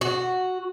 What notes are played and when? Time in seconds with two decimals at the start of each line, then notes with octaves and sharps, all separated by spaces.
0.01 F#4